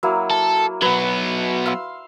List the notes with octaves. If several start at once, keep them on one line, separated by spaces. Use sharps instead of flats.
F#3 A#3 E4
A4
F#3 B3 B4
F5 C6 E6